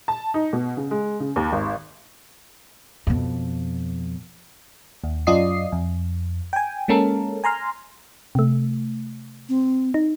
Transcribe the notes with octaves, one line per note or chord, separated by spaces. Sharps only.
A5
D#4
B2
C#3
G#3
C#3
D#2
G#1
F2 B2
D#2
F#2 F4 D5 D#5 D#6 C7
F2
G5 G#5
G#3 A#3 C#4 A4 A#4
G#5 A#5 C6 F6
C3 A3
C4
D#4